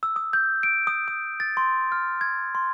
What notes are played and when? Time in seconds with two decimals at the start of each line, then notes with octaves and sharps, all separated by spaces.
0.03 E6
0.16 D#6
0.33 G6
0.63 D7
0.87 D#6
1.08 D#6
1.40 A6
1.57 C6
1.92 F6
2.21 G#6
2.55 C6